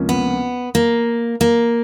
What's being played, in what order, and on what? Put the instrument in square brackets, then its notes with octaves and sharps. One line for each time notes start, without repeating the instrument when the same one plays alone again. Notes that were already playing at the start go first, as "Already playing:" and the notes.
Already playing: [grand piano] C#2 C3 F3 A#3 C#4
[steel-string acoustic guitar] B3
A#3
A#3